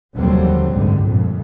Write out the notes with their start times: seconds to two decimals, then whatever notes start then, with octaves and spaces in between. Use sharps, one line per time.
0.15 F1 D#2 D3 F#3 G3 C4
0.72 G#1 C#2 F#2 D3
1.05 G1 F2 A#2